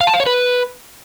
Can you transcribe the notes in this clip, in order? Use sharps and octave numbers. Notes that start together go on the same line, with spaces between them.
F5
A5
F5
C#5
B4